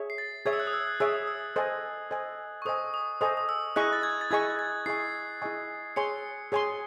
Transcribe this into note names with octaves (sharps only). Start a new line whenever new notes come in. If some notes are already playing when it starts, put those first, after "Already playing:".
Already playing: G#4 C#5 E5
C7
A6
G#4 C#5 E5 G#6
E6
F#6
D#6
E6
F#6
G#4 C#5 E5 E6
D#6
E6
A4 C5 D#5 G#5
A4 C5 D#5 G#5
C#6
A4 C5 D#5 G#5 D#6
D#6
A4 C5 D#5 G#5 D#6
D#6
E6
E4 G#4 D#5 G#5 C#6 F#6
A6
G#6
A6
E4 G#4 D#5 G#5 C#6 G#6
A6
E4 G#4 D#5 G#5 C#6 C7
E4 G#4 D#5 G#5 C#6
G#4 C#5 G#5 C6 C#7
G#4 C#5 G#5 C6